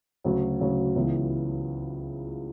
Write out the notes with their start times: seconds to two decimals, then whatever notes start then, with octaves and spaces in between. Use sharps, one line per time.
0.24 D2 C#3 F#3
0.60 D2 C#3 F#3
0.95 C#2 C#3 E3 B3 E4